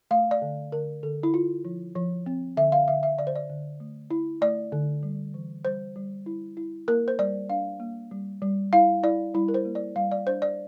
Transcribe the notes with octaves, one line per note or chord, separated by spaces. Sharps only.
A3 F5
D5
D3
D3 A#4
D3 A4
E4
E4 F4
F3
F3
C4
D3 E5
F5
D3 E5
E5
D3 D5
C5
D5
D3
A3
E4
A3 D5
D3
G3
E3
G3 C5
G3
E4
E4
A#3 A#4
C5
G3 D5
D4 F5
A#3
G3
G3
E4 F5
E4 D5
G3 E4
A#4
C5
A#3
D5
G3 F5
D5
D4 C5
D5